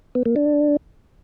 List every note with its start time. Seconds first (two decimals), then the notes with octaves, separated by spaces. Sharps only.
0.15 B3
0.26 A#3
0.36 D4